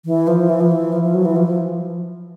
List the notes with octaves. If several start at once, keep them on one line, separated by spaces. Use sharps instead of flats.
E3
F3
E3
F3
E3
F3
F3
F#3
E3
F3